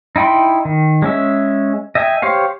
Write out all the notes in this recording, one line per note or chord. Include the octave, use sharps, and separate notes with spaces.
D#4 E4 G5 B5 C6
D#3
G#3 C#4 E5
D#5 E5 G5 G#5
G4 C5 C#5 F5